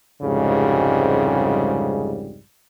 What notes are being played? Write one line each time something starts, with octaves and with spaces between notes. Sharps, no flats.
C2 F2 G#2 C#3 G3 G#3